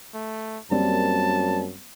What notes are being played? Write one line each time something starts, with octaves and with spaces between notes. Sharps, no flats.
A3
F#2 G3 A#3 C4 A5